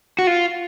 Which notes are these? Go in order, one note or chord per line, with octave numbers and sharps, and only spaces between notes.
F#4
F4